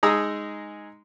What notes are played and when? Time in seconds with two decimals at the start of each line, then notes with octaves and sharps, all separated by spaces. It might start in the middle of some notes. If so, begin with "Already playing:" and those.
0.03 G#3 D#4 G#4 A#5 D#6 E6